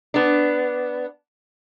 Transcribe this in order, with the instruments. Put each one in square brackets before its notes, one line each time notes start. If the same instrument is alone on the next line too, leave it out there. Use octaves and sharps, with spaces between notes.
[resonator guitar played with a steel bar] B3 D4